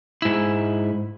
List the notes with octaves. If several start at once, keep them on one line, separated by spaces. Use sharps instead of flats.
G#2 E4